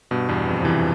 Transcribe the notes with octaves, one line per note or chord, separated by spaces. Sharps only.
G2 B2
E2 G2
F2
F3
C3 E3